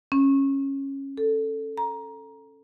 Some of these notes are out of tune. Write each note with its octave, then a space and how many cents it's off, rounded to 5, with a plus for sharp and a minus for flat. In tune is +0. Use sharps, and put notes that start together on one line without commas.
C#4 -15
A4 +5
A#5 +15